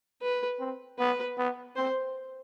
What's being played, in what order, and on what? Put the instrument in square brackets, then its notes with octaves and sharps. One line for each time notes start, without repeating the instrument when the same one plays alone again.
[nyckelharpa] B4
[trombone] C4
[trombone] B3 [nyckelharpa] B4
[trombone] B3
[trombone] C4 [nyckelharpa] C5